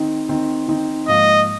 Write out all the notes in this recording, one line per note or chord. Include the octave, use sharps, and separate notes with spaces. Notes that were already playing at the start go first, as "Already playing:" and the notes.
Already playing: D#3 C4 D#4
D#3 C4 D#4
D#3 C4 D#4
G#2 F3 A#3 D#5